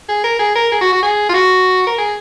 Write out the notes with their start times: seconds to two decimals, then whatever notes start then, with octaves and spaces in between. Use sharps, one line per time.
0.09 G#4
0.24 A#4
0.39 G#4
0.55 A#4
0.72 G#4
0.81 F#4
0.92 F#4
1.03 G#4
1.29 F4
1.34 F#4
1.87 A#4
1.98 G#4